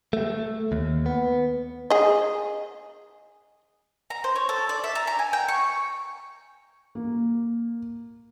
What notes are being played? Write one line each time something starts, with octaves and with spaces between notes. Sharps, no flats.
A3
D#2
B3
G#4 D#5
A#5
C5
C#5
A4
D5
E5
A#5
A#5
G#5
G5
C#6
A#3